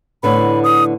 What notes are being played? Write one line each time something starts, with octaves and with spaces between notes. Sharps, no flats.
A2 D3 B3 B5
D#6